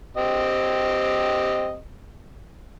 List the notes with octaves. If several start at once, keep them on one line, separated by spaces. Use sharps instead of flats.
C4 G4 D#5